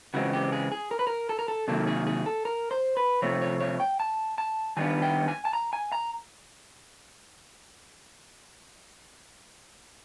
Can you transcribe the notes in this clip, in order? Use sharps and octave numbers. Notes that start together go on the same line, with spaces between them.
C#3 E3 G#3 C4 F#4
G4
G#4
G#4
A#4
B4
A#4
A4
A#4
A4
C3 D#3 F#3 A#3 A4
G#4
G#4
A4
A#4
C5
B4
C3 F3 A3 C4 C#5
C#5
C#5
G5
A5
A5
D#3 G3 B3 D4 G#5
G5
G#5
A5
A#5
G#5
A#5